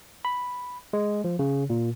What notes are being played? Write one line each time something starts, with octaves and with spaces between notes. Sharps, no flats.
B5
G#3
F3
C#3
A#2